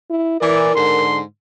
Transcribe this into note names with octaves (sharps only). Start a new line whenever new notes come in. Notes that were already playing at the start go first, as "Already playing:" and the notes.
E4
E3 A#4 D5
G#2 D3 C6